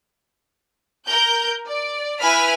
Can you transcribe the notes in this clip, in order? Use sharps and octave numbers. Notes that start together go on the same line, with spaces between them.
A#4 G6
D5
E4 B4 G#5 B5 F6 B6